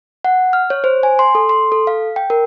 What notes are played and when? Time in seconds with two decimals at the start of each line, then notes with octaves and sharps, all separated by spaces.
0.25 F#5
0.53 F6
0.70 C#5
0.84 C5
1.03 G#5
1.19 C6
1.35 A4
1.49 C6
1.72 A4
1.87 F5
2.16 G5
2.30 A#4